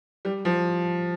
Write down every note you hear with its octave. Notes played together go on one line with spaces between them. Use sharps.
G3
F3